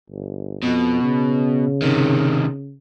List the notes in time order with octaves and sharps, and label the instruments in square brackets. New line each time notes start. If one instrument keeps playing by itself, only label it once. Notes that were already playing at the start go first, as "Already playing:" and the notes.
[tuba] G1
[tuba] F2 [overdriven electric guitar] B2
[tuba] C#3
[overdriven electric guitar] C3 D#3